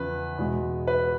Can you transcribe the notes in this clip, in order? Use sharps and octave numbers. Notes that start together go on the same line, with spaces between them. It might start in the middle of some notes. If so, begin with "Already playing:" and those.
Already playing: E2 C#3 F3 B4
E2 B2 G#3
B4